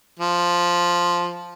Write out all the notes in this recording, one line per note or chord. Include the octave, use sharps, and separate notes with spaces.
F3